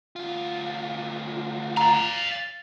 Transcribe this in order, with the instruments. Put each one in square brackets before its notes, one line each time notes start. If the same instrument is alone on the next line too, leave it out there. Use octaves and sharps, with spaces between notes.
[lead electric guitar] D2 F4
[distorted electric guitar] D5 F5 [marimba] A#5